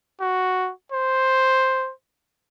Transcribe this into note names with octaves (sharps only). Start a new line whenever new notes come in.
F#4
C5